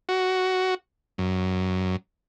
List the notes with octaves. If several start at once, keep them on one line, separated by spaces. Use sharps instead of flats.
F#4
F#2